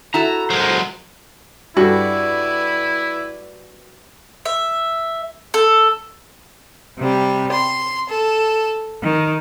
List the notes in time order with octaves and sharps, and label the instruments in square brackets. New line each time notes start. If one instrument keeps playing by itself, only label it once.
[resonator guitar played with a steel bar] E4 F#4 A4 [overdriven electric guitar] A#5
[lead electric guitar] F#3 G#3 [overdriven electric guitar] A#4 C5
[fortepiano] G2 A4 [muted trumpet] E4 [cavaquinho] F#4 [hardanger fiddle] B4 D5
[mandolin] E5
A4
[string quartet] C3 G3
C6
A4
D#3